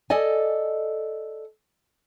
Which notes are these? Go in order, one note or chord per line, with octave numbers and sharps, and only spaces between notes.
A4 D5 D#5 G#5